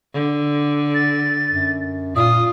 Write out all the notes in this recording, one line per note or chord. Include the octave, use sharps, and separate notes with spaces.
D3
A6
F#2
A#2 F4 D#6